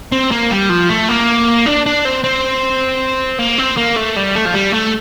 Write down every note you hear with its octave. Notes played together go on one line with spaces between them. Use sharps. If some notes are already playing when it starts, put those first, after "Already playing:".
C4
A#3
G3
F3
A3
A#3
D4
D4
C4
C4
A#3
C4
A#3
A3
G3
A3
F3
G3
A3